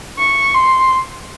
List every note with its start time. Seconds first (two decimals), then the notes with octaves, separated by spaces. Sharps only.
0.19 C#6
0.54 C6